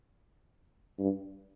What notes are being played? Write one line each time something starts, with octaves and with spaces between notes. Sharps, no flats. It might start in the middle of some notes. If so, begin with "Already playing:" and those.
G2